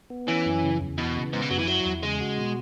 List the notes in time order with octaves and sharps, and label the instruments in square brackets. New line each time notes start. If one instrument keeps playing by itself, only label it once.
[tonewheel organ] B3
[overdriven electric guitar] E3 [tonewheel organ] C#4
[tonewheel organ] F#2
C#3
E2
[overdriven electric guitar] B2 [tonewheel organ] E3
[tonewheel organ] C#3
[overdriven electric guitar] G#2 [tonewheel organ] B3
[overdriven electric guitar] B2
[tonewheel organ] F#2 [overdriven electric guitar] F#3
[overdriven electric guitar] E3
[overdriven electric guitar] F#3 [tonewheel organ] E4
[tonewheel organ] E2
[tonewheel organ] C#3 [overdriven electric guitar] G#3
[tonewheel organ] F#4
B2